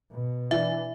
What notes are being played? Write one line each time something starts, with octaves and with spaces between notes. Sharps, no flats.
B2
E3 D4 E5